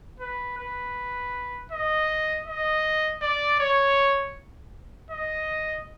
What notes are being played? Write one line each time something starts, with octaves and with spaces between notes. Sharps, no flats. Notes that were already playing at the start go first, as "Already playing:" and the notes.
B4
B4
D#5
D#5
D5
C#5
D#5